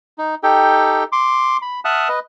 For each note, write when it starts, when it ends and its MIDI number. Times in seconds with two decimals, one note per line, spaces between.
0.18 0.35 63
0.43 1.04 63
0.43 1.04 67
0.43 1.04 69
0.43 1.04 79
1.12 1.57 84
1.12 1.57 86
1.62 1.80 83
1.85 2.08 76
1.85 2.08 78
1.85 2.08 81
1.85 2.08 87
1.85 2.08 89
1.85 2.08 90
2.09 2.19 71
2.09 2.19 75